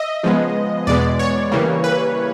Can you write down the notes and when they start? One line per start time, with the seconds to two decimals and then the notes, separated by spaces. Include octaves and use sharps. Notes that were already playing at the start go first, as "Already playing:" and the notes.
Already playing: D#5 E5
0.23 C#3 F3 G#3 B3
0.87 E2 B2 G#3 B3 D5
1.19 C#5
1.52 C#3 E3 G3 A#3
1.84 B4